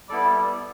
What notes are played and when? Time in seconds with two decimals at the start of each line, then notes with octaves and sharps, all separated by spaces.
0.09 G3 B3 E4 A4 D5